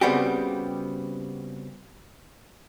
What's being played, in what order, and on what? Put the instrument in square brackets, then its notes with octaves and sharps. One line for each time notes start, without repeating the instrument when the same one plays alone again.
[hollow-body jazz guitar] C#3 G3 B3 C4 F#4 G4